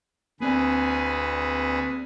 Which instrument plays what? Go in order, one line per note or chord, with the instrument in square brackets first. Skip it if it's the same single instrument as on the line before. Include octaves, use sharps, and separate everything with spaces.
[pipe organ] D2 G#4 B4 [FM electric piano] A#3 C4 D5